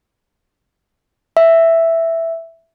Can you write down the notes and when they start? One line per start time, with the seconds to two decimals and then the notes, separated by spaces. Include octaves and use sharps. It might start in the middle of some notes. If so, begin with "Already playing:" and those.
1.37 E5